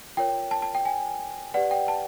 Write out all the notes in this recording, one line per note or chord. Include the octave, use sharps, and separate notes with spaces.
F4 A#4 C#5 G5
A5
A5
G5
G#5
G4 B4 D5 F#5
G5
A5